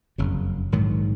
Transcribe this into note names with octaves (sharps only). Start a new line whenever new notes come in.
F#1 F2 C#3
A#1 G#2 D#3 F#3